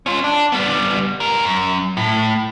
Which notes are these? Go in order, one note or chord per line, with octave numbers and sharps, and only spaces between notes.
C#4 F4
D4
G3 B3
G#2 A#4
F#2
A2